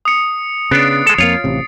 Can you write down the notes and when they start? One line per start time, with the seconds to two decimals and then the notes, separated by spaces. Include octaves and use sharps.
0.05 D#6 C#7
0.71 C#3 B3 D4 A6 C7 D7
1.06 G#3 A4
1.18 F2 A#3 F4 C#5
1.44 A1 C3